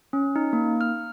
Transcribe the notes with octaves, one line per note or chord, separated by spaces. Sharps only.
C#4
D#4
A#3
F6